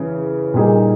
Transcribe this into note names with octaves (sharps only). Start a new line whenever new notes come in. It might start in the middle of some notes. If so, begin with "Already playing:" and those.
Already playing: C#3 E3
A#2 G3 A#3 D#4 G#4